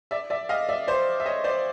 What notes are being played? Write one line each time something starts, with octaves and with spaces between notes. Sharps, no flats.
D5 E5
D5 E5
D#5 F5
D5 E5
C5 D5
E5
C#5 D#5
C5 D5